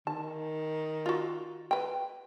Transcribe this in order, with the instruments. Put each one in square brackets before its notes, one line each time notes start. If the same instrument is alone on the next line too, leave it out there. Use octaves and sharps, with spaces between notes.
[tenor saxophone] D#3 [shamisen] A5
[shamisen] F4 F#4
B4 G5